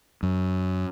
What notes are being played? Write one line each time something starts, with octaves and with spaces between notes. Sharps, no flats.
F#2